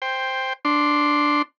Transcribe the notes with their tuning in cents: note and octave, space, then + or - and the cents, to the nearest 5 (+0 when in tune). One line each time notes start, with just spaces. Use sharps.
C5 +0 G5 +10
D4 +0 C6 +0